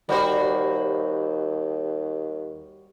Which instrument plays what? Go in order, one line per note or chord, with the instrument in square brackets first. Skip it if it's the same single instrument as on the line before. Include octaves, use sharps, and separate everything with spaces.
[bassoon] D#2 [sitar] G3 F#4 C5